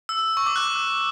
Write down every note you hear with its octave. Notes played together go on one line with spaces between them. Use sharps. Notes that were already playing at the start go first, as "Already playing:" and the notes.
E6
C#6
D6
F#6